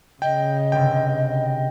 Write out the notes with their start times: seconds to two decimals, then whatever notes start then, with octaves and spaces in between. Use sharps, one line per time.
0.22 C#3 D#5 G5
0.72 G1 C3 G5